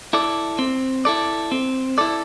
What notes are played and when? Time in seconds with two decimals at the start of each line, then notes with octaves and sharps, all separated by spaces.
0.13 E4 A4 D5
0.59 C4
1.05 E4 A4 D5
1.52 C4
1.98 E4 A4 D5